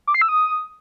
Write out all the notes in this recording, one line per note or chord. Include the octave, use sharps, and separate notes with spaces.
D6
C7
E6
D#6